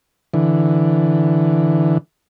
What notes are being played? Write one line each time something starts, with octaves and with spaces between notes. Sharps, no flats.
D3 E3